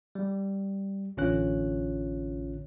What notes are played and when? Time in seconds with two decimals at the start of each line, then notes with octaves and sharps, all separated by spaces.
0.15 G3
1.17 A1 D3 C#4 F4 C#5 F#6